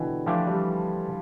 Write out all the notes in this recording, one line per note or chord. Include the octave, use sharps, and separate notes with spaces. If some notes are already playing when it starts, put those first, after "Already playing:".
Already playing: B2 D3 E3 G3
E3 F3 A3 D4 G4
G3